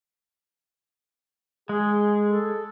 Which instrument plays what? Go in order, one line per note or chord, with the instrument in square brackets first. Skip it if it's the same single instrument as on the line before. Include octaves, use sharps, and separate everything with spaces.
[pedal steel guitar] G#3 [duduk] G#4
[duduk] A4